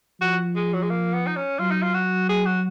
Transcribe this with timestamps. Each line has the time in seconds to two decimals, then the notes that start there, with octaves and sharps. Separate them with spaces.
0.21 F3 F#4
0.56 G#3
0.73 F#3
0.82 G#3
0.90 A#3
1.13 B3
1.26 D#4
1.36 C#4
1.59 F#3 F4
1.71 D#4
1.82 F4
1.94 F#4
2.29 G#4
2.46 F#4